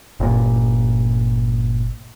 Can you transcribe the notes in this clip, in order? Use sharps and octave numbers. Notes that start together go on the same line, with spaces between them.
G1 A#2